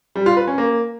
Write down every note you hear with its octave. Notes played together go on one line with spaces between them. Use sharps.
G3
F4
B4
C#4
A#3